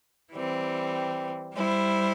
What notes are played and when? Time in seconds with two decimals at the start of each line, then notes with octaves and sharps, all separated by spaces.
0.32 E3 G3 C4
1.54 G3 E4 C5